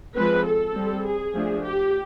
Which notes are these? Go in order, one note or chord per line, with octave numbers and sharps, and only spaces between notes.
F3 G#3 C4 B4
A4
G3 C4
G#4
F3 A3 D4
G4